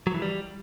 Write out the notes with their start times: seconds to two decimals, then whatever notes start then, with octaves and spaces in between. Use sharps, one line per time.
0.07 F#3
0.14 E3
0.22 G3